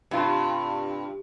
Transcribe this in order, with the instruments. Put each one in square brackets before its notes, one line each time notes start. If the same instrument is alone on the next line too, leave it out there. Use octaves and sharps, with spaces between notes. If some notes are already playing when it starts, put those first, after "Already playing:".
[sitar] G2 [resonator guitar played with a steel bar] C3 F4